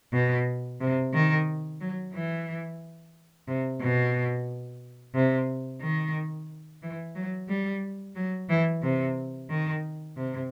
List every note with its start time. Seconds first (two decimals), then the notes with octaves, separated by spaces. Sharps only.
0.13 B2
0.81 C3
1.14 D#3
1.80 F#3
2.13 E3
3.47 C3
3.81 B2
5.15 C3
5.81 D#3
6.82 E3
7.15 F#3
7.48 G3
8.16 F#3
8.49 E3
8.82 C3
9.49 D#3
10.16 C3